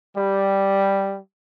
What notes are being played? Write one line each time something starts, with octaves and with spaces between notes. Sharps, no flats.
G3